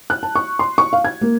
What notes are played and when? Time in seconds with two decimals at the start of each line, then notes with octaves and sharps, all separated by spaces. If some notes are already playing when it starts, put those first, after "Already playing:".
0.10 F#6
0.23 A5
0.35 C#6
0.59 C6
0.78 C#6
0.93 F5
1.05 G#6
1.21 A#3